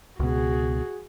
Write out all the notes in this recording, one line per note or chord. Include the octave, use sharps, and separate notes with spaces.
C#2 B2 F#4 G#4